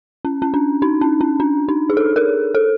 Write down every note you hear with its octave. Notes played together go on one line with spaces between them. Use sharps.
C#4
C#4
D4
D#4
C#4
C#4
D4
D#4
G#4
A4
A#4
A4